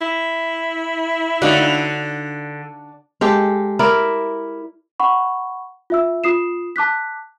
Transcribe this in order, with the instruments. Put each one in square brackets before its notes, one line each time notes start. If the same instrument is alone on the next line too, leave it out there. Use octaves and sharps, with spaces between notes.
[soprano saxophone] E4
[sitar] D3 [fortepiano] D#4 F#4 [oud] D5 F5
[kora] G#3 G4 A4
E4 A#4 D5
[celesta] F#5 B5 C#6
F4 E5 E6
F4 D#6 C7 E7
A5 D6 F#6 B6